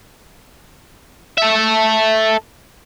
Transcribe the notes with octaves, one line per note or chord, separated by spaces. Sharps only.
A4 E5